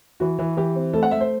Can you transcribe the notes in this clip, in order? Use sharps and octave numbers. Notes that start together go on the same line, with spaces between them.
E3 F#4
E3
E3 G4
C4
A3 A4
F#5
A3 E5
C5